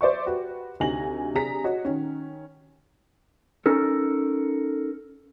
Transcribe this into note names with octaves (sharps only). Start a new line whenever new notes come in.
C5 D5 E5 C#6
F#4 G4 B4
D2 C3 D#4 G#5 A#6 F#7
C3 D4 G#4 A#5 B6
F#4 C#5 D#5
D#3 C#4
C#4 D#4 A4 A#4